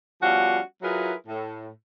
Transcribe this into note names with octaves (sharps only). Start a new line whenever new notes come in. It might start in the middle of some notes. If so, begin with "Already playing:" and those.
F3 G3 B3 C#4 F4 F#4
F#3 E4 F4 G#4 A#4 B4
A2